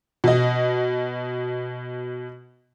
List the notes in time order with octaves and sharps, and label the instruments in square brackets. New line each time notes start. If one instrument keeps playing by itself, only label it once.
[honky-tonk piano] B2 D#5